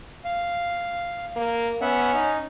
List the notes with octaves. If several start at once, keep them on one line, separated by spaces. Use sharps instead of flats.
F5
A#3
B3 C#4 E5 F#5
D#4